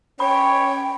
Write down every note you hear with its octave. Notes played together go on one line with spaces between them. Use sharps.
C#4 C#5 G5 B5